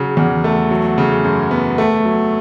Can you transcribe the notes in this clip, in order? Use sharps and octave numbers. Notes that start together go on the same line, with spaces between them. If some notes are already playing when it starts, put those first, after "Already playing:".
Already playing: C#3 F#3
E2
A3
F#3
C#3
F#2
B3
A3
F#3